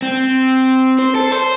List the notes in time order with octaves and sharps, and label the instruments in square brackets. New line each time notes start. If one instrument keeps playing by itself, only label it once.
[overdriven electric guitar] C4
C5
A4
C5